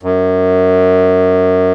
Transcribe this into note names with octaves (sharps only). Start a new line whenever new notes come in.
F#2